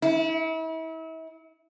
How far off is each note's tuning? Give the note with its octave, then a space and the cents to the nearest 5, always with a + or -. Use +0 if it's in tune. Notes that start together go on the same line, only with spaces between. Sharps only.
E4 -35